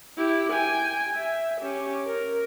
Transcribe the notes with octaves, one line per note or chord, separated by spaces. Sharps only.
E4 G4
G5 G#5
E5
C#4 G4
A#4